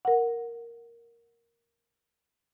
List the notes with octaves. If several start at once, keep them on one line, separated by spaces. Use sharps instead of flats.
A#4 F#5